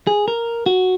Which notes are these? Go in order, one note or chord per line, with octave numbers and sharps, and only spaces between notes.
G#4
A#4
F#4